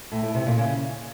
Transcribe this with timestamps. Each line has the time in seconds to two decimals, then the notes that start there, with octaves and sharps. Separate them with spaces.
0.12 A2
0.23 A2
0.35 C3
0.46 A#2
0.58 C#3